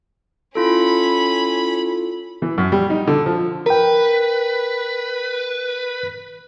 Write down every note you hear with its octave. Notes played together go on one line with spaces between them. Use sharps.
C#4 E4 F4 A4 B5
E3
F#2
G3
D#4
D3
F3
A#4 B4 G5